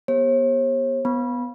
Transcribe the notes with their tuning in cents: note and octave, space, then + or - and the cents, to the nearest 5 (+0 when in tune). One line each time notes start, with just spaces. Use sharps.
B3 -30 G4 +15 C#5 -45
B3 +0 B5 -25